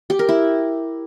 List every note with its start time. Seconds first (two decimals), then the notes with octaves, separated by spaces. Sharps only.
0.10 G4
0.19 A#4
0.29 E4